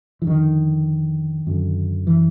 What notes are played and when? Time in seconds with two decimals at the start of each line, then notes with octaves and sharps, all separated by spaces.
0.22 E3
0.27 F2 D3 D#3
1.47 F#2 D3
2.07 E3